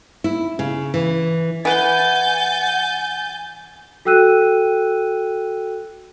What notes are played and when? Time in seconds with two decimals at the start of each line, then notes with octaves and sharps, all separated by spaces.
0.24 E4
0.59 C#3
0.94 E3
1.65 E3 B4 F#5 G#5 G6 A6
4.05 F#4 A4 G5 E6 F#6 D#7